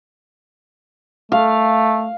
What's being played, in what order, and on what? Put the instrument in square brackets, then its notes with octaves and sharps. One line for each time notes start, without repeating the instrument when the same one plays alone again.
[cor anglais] A3 [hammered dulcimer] F5